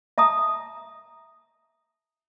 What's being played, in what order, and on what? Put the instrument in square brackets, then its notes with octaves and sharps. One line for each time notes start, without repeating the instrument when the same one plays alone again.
[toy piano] E5 A5 A#5 D#6